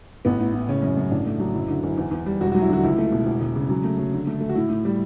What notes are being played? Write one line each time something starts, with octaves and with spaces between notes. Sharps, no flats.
A1 B3
A2
A2
C#3 C#4
F#2
F#2
A1 D4
A3
F#3
F#1 E4
D3
F#1
E2
E2
G3
E1 F#4
F#4
F#3
E4
D3 F#4
C#2 E4
A3
B2
E1
E1
C#3
F#3
A3
F#3
D3
A3
A3
F#4
A2 E4
A2
G3